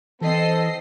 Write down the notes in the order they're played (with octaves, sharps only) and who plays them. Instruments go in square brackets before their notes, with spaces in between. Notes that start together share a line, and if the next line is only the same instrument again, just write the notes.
[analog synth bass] E3 [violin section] C4 D#5 C7 [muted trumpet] A4